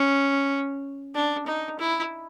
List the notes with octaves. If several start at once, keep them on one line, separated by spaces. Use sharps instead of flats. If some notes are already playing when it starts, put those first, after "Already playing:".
Already playing: C#4
D4
D#4
E4